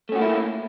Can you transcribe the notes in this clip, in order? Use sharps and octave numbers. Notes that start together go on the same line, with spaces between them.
A3 A#3 C#4 E4 F#4